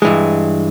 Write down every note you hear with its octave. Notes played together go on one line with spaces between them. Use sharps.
G2 E3 G#3